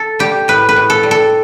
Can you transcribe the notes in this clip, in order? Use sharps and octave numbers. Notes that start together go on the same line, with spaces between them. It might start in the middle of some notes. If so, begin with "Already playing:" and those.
Already playing: A4
G3 G4
A2 B4
B4
A2
A4
G3
A4